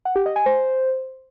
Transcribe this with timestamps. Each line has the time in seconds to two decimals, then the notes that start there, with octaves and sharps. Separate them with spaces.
0.05 F#5
0.16 G4
0.26 D#5
0.36 G#5
0.46 C5